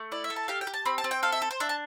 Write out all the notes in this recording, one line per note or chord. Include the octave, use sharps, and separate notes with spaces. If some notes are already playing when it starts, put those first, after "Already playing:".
Already playing: A3
E4 D5
E5
A4
A5
G4 F5
G5
G4
A5
C4 B5
A5
C4
G5
A4 F5
E5
A4
C5
D4 E5
A5